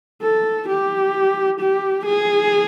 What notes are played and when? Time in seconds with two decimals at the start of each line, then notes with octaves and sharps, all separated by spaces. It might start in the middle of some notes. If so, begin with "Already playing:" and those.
0.22 A4
0.68 G4
1.60 G4
2.05 G#4